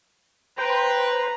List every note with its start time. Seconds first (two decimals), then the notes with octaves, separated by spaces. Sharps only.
0.58 B4 C5 G5 A#5